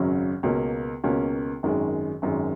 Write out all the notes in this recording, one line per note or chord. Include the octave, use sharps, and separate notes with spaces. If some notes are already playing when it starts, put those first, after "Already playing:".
Already playing: G#1 F#2 C#3 F#3 C#4
C#2 B2 A#3 C#4
C#2 B2 A#3 C#4
G#1 F#2 D#3 G#3
G#1 F#2 D#3 G#3